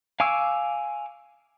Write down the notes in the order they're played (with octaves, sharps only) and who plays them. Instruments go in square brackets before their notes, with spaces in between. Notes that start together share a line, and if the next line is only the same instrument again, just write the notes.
[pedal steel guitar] F5 G#5 C#6 D6 E6